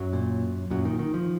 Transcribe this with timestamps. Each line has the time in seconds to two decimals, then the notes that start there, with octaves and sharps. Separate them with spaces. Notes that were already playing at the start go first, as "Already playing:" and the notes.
Already playing: F#2 F#3
0.13 A#2
0.70 F#2 A#2 F#3
0.85 D#3
0.99 D#3
1.14 F3